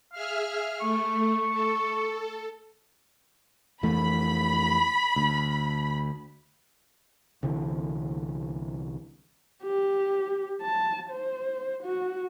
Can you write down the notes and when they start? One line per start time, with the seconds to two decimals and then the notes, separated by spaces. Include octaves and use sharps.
0.13 G#4 E5 F5 F6
0.80 A3 C#6
1.50 A4
3.83 F2 E3 A3 B5
5.16 D2
7.43 C2 D3 E3
9.63 G4
10.62 A5
11.10 C5
11.83 F#4